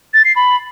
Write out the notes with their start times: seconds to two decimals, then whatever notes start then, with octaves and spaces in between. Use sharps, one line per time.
0.14 A6
0.25 C7
0.36 B5